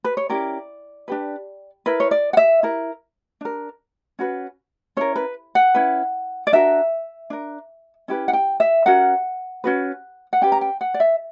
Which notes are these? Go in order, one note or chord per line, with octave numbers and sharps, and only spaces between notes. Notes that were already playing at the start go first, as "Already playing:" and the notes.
B4
C#5
C#4 E4 G4 A#4 D5
D4 G4 B4
E4 A#4 B4
C#5
D5
F#5
E5
E4 A#4
D4 A#4
C#4 F#4 B4
C#4 E4 A#4 C#5
B4
F#5
C#4 E4 B4
D5
D4 F#4 A#4 E5
D4 A#4
C#4 E4 G4 B4
F#5
G5
E5
C#4 F#4 A#4 F#5
C#4 F#4 B4
F#5
C#4 G4 B4 G5
A#5
G5
F#5
D5
E5